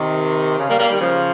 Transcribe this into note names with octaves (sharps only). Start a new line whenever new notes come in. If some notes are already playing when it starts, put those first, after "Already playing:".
Already playing: C3 D#3
C#3
G3 A#3
G3 A#3
D#3 G3
C#3 F3